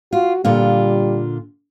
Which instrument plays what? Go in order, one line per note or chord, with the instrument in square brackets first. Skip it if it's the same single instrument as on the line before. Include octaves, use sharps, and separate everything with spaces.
[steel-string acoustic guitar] F4 [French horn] F#4
[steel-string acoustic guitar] A#2 D3 F4 [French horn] G3